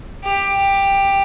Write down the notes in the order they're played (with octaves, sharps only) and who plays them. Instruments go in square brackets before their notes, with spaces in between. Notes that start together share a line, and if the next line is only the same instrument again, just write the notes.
[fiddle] G4